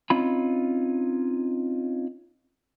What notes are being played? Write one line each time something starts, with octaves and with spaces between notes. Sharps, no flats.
C4 C#4 D#4 F4 B5